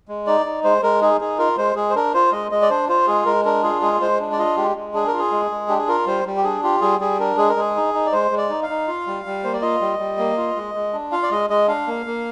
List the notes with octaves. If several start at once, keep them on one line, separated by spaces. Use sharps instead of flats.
G#3
D#4 D5
D#4
G#3 C5
G#3 A#4
D#4 G#4
D#4 G#4
F4 A#4
G#3 C5
G#3 G#4
C5
D4 A#4
F4 C5
G#3 D#5
G#3 D#5
D5
D4 C5
F4 C5
G#3 G#4
G#3 A#4
D4 A#4
F4 G#4
G#3 G#4
G#3 C5
D4
D5
F4 D#5
G#3 G4
G#3
D4 G#4
A#4
F4
G#4
G#3
G#3
D4 G4
G#4
F4 A#4
G3 C5
G3
G4
D4 G#4
F4 G4
G3 G#4
G3 G#4
D4 A#4
G#3 G#4
A#4
G#3 G#4
D#4
D#4
D5
G#3 C5
G#3
D5
D#4
F5
D#4
F4
G3
G3
A#3 C5
D5
F4 D#5
G3
G3
A#3
F4
G#3
G#3
D4
F4 F5
D5
G#3 D#5
G#3 D#5
D4 F5
A#3
A#3